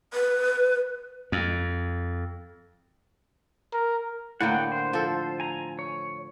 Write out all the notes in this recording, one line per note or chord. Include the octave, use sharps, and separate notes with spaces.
B4
F2
A#4
A2 D3 A#3 F#5 G5
C5
F3 A4
G#5 A#5
C#5